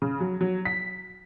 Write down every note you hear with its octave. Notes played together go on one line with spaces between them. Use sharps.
C#3
F#3
F#3
B6